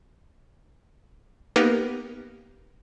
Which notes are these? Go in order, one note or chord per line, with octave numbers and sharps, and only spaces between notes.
A#3 B3 D#4 G4 A#4 B4